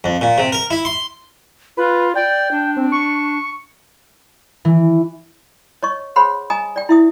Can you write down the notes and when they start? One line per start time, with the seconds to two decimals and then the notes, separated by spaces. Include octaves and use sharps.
0.04 F2
0.21 A#2
0.38 C3
0.52 A#4
0.70 E4
0.85 C6
1.77 F4 B4
2.15 D5 G5
2.51 D4
2.77 C4
2.92 C#6
4.65 E3
5.83 C#5 D#5 C#6
6.16 G#4 C5 C#5 F#5 B5 C6
6.50 D#5 G#5 A#5 D#6
6.76 D5 G5
6.89 E4 E5 D#6